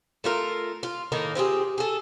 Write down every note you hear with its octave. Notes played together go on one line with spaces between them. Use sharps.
A3 F4 A#4
F4
A2 D#3 A#3 D#4
C4 F4 G4 G#4
G#4 A4